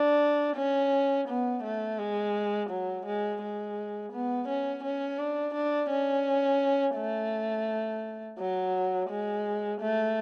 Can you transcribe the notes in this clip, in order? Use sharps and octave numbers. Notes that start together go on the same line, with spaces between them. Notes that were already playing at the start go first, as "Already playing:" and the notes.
Already playing: D4
C#4
B3
A3
G#3
F#3
G#3
G#3
B3
C#4
C#4
D4
D4
C#4
A3
F#3
G#3
A3